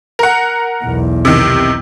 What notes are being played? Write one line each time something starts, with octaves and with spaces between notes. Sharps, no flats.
A#4 F#5
B1 E2
C3 D#3